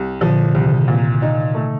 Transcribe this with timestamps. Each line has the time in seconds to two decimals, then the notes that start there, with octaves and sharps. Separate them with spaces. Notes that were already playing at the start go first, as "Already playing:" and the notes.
Already playing: C2
0.21 A#2 D3 F3
0.55 C2 C3 D#3
0.88 A#2
1.22 D#4
1.55 A3